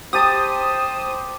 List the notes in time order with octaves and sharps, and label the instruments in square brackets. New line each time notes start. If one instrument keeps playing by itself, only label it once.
[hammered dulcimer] G4 A5 [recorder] C5 [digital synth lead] D#6